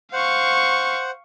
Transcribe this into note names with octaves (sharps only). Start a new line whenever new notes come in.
C5 F5 F#5 C#6